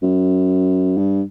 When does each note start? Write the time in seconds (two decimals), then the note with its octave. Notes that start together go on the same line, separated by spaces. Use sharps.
0.03 F#2
0.97 G2